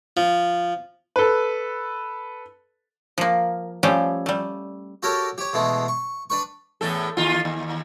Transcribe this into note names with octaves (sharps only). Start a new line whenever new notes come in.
F3
A4 B4
F3 A#3
F3 G3 A3 C#4 G4
G3 A3
F#4 G4 A4 A#4 C#5
G4 C#5
B2 E3 G#3 A3
C#6
D4 B4 C#6
E2 A2 A4
D#2 F4
D#2